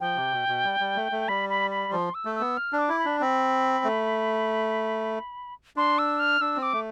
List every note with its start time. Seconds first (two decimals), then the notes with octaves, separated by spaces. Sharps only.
0.01 F3 G5
0.16 C3
0.33 B2
0.48 B2
0.65 G3
0.80 G3
0.96 A3
1.12 A3
1.28 G3 B5
1.49 B5
1.71 B5
1.92 F3 C6
2.14 E6
2.25 A3
2.35 E6
2.40 B3
2.57 F6
2.73 D4
2.78 D6
2.89 E4
2.99 B5
3.05 D4
3.21 C4 B5
3.84 A3
5.76 D4 C6
5.99 E6
6.19 F6
6.41 D4 E6
6.56 C4
6.63 D6
6.73 A3